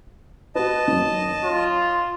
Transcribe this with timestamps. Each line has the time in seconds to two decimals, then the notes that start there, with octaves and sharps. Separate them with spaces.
0.55 F#4 B4 D#5 A5
0.88 F#2 D#3
1.44 F4 C#5